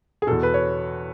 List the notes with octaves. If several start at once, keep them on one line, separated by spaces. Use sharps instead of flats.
G#4
E2 B2 A4
B4
C#5